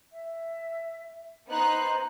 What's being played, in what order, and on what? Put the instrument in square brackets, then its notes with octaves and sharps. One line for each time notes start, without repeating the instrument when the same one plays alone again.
[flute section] E5
[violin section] B3 D#4 F#6 [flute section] C5 D#5 A#5